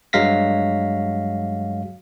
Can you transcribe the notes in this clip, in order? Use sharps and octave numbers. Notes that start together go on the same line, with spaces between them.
G2 F#3 G#3 F5 A#6 B6